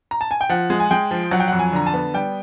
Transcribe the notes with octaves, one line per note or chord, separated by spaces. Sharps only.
A#5
A5
G#5
G5
F3 F#5
G#3
G#5
G#3 G5
F3
F#3 F#5
G5
F2 F#5
G#5
D3 A#5
A5
B3
G3 G5